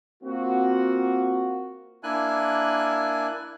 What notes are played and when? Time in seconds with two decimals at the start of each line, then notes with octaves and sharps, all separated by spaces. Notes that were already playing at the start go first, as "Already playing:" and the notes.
0.23 A#3 C4 F4 F#4
2.03 A#3 D4 E4 G#5 F#6